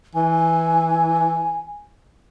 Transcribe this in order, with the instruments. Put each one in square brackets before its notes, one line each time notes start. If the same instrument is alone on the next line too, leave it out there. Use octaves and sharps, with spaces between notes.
[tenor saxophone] E3 [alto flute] G#5